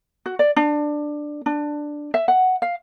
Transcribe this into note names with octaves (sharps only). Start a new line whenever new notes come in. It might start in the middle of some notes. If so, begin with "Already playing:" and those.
F#4
D5
D4
D4
E5
F#5
F5